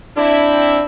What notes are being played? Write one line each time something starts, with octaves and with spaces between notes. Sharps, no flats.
C4 D4 E4